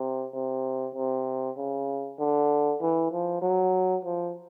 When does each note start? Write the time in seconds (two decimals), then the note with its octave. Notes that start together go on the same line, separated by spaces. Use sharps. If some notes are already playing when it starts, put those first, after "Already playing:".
Already playing: C3
0.34 C3
0.95 C3
1.57 C#3
2.19 D3
2.81 E3
3.12 F3
3.42 F#3
4.05 F3